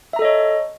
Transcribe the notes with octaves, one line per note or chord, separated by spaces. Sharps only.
A4 C#5 D#5 E5 A#5